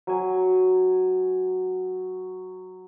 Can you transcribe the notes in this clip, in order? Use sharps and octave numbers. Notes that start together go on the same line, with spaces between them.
F#3 G#5